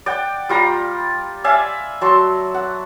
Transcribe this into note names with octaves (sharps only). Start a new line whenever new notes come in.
D5 F#5 G5
G3 F4 A#5
D5 E5 F5 G#5
F#3 A5 C6
F#5